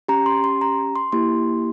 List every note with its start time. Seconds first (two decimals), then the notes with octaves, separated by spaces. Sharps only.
0.08 C#4 G4 A#5
0.26 C6
0.44 C6
0.61 A#5
0.96 C6
1.12 A#3 E4 G4 C6